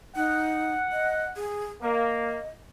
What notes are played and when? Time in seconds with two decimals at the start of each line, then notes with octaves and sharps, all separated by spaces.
0.16 D#4 F#5
0.92 D#5
1.36 G#4
1.83 A#3 D#5